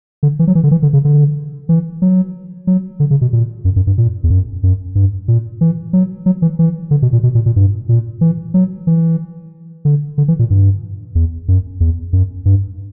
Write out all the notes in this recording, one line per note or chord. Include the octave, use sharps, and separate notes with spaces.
D3
E3
F#3
E3
D3
E3
D3
C#3
D3
E3
F#3
F#3
D3
C#3
B2
A#2
F#2
F#2
G2
A#2
E2
F#2
F#2
G2
A#2
E3
F#3
F#3
E3
E3
D3
B2
A#2
B2
A#2
A#2
G2
A#2
E3
F#3
E3
D3
D3
E3
A#2
G2
E2
F#2
E2
F#2
G2